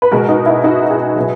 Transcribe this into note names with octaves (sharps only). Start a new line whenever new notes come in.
B4
B2 G#3 F#4 A#4
D#4 F#4
E4
D#4 F#4
E4 G#4
B2 F#3